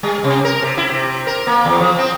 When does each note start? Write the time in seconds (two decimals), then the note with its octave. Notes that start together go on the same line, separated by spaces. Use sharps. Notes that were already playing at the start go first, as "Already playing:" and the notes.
0.03 G3
0.24 C3
0.45 A#4
0.62 C3
0.77 E4
0.90 C3
1.27 A#4
1.47 A#3
1.65 E2
1.80 F3
1.98 C4